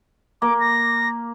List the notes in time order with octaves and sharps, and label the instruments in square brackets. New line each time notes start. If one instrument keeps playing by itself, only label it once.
[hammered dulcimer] A#3 [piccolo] D6
[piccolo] A#6